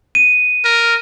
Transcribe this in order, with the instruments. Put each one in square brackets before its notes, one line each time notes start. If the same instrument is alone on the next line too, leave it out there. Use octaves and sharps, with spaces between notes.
[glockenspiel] D#7
[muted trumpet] A#4